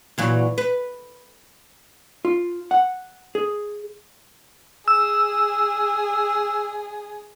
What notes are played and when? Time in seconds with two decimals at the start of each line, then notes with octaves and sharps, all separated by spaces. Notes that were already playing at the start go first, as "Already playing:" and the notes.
0.18 A#2 E3 F#3
0.58 B4
2.25 F4
2.71 F#5
3.35 G#4
4.88 G#4 E6